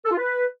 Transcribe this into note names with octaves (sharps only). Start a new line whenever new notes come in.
A4
F4
B4